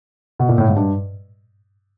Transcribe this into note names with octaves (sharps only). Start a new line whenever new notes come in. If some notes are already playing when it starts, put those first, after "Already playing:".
B2
A#2
A2
G#2
G2